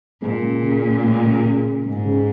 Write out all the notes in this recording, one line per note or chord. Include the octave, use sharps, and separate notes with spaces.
A#2 G#3
C#3
C#3
C#4
G#3
C#3
C#3
C#4
G#2 G#3
C#3